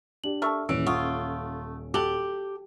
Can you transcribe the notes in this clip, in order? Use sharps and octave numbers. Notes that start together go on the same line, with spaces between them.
D4 G4 F#7
A3 A#4 A5 C#6 E6 F6
D#1 E3 C#4 E6 D7
A3 F4 F#5 C#6 D#6
F#4 G4 A4 D6 F#7 G7